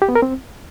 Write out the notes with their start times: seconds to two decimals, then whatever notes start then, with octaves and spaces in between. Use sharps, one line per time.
0.02 G4
0.09 B3
0.15 A#4
0.22 C4